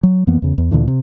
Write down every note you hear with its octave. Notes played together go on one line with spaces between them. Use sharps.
F#3
F2 E3 A#3 B3
E2 C#3
E2
D2 A#2 D3 E3
C3